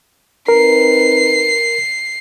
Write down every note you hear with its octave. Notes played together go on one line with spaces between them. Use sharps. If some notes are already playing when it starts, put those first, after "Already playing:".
C4 D#4 A#4 B4 C7